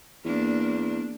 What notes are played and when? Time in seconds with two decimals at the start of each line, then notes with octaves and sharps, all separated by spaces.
0.25 E2 A#3 D4